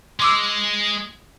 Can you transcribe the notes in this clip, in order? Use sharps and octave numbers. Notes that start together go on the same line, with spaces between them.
G#3 C6 D6 E6